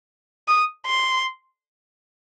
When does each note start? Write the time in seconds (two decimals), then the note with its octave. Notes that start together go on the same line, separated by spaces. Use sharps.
0.48 D#6
0.86 C6